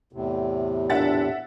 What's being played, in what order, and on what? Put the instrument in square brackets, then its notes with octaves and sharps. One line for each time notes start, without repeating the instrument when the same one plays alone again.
[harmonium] E2 A2 C3
[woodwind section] A#2 D4 [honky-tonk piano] E5 F#5 A6